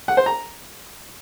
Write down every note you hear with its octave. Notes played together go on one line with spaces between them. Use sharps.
F#5
C5
A#5